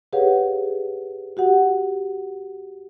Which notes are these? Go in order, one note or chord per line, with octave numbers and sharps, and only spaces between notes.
G4 G#4 B4 C#5 F5 F#5
F#4 G4 F#5